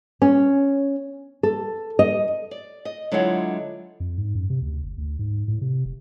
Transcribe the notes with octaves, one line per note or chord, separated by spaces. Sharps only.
C#4
A4
D#5
D5
D#5
D3 F#3 G#3 E4 F4 F#5
F2
G#2
F#2
C3
D2
F#1
D2
G#2
A2
C3
F1